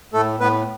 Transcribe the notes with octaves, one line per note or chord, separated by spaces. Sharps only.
A2 A3 A4
A2 B3 B4